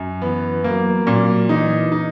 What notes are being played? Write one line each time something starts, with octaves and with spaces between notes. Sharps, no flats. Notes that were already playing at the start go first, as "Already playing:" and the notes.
Already playing: F#2
E3 B3
F#3 A#3
A#2 F#3
E3 D#4
D#4